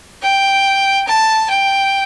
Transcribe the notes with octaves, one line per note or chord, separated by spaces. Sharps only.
G5
A5
G5